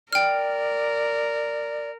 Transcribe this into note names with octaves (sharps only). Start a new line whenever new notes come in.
A#4 D5 G5 F6